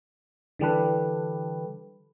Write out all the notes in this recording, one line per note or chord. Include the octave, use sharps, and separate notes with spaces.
D3 E3 G3 G4 A4 B4